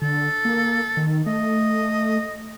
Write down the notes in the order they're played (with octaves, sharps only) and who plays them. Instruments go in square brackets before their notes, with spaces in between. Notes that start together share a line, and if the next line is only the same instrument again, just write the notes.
[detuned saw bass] D3 [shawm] A4
[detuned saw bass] A#3
D#3
[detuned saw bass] A3 [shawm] D#5